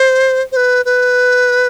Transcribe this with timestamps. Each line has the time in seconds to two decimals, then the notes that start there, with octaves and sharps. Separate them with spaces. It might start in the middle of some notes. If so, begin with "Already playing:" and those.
Already playing: C5
0.52 C5
0.56 B4
0.85 B4